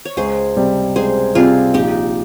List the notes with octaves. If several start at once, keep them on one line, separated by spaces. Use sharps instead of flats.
C#5
C#2 G#4 C5
C3 G3 C4
C#2 G#4 C5
C3 G3 C4 F4 G#4
A#1 D#4 G4